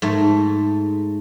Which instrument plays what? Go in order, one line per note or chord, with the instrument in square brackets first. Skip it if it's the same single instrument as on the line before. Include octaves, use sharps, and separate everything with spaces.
[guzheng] G#2 A3